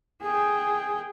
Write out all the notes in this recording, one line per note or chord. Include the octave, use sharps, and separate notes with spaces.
G#4 G5